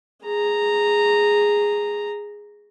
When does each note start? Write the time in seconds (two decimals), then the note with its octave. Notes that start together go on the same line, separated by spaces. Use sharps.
0.24 G#4 A#5